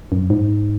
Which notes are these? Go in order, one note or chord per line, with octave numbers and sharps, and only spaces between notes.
F#2
G#2